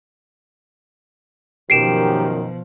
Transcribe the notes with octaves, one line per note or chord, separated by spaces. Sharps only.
F#2 B2 D#3 F3 G4 C7 D7 E7